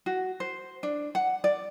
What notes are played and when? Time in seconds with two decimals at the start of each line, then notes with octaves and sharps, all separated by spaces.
0.06 F#4
0.40 C5
0.83 D4
1.15 F#5
1.44 D5